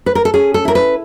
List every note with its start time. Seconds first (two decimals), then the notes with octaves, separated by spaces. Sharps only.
0.06 B4
0.15 A#4
0.25 A4
0.34 C#4 G#4
0.54 A4
0.65 E4 A#4
0.75 B4